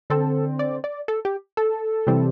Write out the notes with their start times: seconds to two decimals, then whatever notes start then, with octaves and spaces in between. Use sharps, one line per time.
0.10 D3 C4 A4
0.59 D5
0.84 D5
1.08 A4
1.25 G4
1.57 A4
2.07 C3 E3 G3 C4